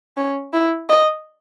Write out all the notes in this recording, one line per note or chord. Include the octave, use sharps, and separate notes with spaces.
C#4
E4
D#5